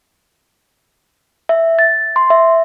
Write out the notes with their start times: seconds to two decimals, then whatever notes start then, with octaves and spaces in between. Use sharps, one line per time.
1.49 E5
1.79 A6
2.16 C6
2.30 E5